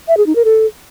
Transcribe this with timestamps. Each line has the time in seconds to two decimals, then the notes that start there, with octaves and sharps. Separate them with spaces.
0.08 E5
0.17 G#4
0.26 D#4
0.36 A#4
0.45 A4